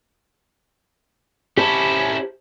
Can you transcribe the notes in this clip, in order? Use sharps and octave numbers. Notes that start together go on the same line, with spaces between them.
C#4 E4 G4 C5 A5